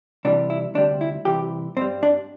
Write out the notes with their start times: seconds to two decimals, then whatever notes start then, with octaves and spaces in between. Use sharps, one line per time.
0.25 C2 C3 E3 G3 D4
0.50 E4
0.75 D2 C3 G3 D4
1.01 E4
1.25 C2 C3 E3 G4
1.77 G2 G3 C4
2.03 D4